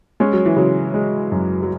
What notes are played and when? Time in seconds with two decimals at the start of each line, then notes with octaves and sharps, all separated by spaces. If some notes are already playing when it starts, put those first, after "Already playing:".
0.20 G#3 C#4
0.33 F#3
0.45 E3
0.56 C#3 F#3
0.94 G#3
1.32 F#2
1.63 F#3